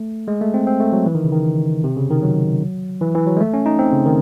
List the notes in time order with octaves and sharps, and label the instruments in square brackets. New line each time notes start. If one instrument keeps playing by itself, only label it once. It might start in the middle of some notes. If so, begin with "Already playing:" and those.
Already playing: [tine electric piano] A3
G#3
A3
C4
C4
A3
F#3
E3
D#3
C#3
D#3
C3
C#3
D#3
F#3
E3
E3
F#3
G#3
A3
C#4
D#4
C4
C#3
D#3